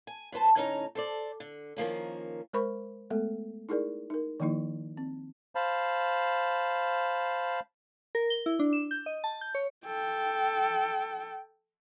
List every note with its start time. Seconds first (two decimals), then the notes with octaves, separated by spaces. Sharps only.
0.07 G#5
0.32 F#2 B4 C5 A5
0.56 A2 D3 C#4 D#4 F5 A#5
0.95 A4 C5 D5
1.40 D3
1.76 D#3 F3 A#3 C#4
2.53 G#3 A#4 C5 B5 C#6
3.10 G#3 A3 B3 A4
3.69 D#4 E4 G#4 A#4 D5
4.10 D#4 A#4
4.40 D#3 F3 A#3 D#4 E4
4.97 C4
5.55 C5 F5 A5 B5
8.15 A#4
8.30 G7
8.46 E4
8.59 D4
8.73 E7
8.91 G6
9.06 D#5
9.24 A5
9.41 G6
9.55 C#5
9.86 A4 G5